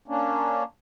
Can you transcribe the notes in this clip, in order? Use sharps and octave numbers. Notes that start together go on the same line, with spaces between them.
A#3 C#4 D4